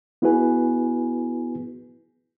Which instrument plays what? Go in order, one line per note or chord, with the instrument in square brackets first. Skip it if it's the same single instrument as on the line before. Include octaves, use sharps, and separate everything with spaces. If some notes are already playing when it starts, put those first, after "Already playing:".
[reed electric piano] B3 E4 F#4 G#4 B4 G#5